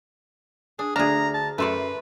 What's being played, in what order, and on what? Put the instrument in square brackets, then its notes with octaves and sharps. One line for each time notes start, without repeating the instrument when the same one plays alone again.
[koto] D4 [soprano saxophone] G#4
[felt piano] D2 D5 F6 [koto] D4 G#4 [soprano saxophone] A#5
[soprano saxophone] A5
[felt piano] F#2 C6 [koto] A3 A4 D5 [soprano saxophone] B4